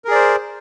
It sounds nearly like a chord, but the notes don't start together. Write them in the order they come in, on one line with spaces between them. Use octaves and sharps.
A#4 G#4 D5 C5